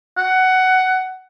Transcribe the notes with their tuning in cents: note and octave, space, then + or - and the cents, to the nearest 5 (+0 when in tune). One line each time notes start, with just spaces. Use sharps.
F#5 +15